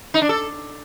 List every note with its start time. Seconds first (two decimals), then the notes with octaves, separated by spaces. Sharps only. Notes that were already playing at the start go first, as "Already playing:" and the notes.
0.14 D#4
0.22 D4
0.29 A4